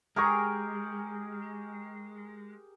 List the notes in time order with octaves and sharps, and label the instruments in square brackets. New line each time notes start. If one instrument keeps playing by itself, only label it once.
[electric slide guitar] G#3 [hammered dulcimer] G4 G#4 A#4 [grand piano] G#5 A#5 C#6